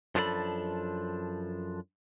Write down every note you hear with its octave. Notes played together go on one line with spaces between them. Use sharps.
F#2 F3 D4 F4 A4 B5